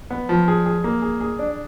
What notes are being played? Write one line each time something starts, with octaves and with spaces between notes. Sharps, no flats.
B3
F3
G#4
G#4
A#3
G#4
G#4
D4